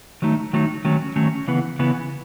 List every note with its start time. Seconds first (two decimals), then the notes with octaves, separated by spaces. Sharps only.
0.22 D#3 F#3 A3 D#4
0.53 D#3 F#3 A3 D#4
0.85 D#3 F#3 A3 C#4
1.16 D#3 F#3 A3 C#4
1.47 C#3 E3 B3
1.79 C#3 E3 B3